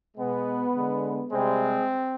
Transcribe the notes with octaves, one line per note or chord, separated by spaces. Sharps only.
B2 G#3 B3
D3 G#3
C3 G3 G#3 C4